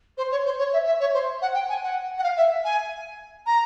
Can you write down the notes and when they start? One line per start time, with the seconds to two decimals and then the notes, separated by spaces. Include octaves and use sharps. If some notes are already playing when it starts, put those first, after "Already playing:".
0.18 C5
0.31 C#5
0.45 C5
0.59 C#5
0.73 E5
0.86 E5
1.00 C#5
1.13 C5
1.42 F#5
1.54 G5
1.69 G#5
1.83 F#5
2.18 F#5
2.23 F5
2.37 E5
2.65 G#5
3.46 A#5